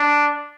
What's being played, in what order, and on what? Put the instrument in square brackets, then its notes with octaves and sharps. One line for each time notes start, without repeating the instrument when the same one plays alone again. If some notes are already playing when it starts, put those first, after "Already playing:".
Already playing: [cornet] D4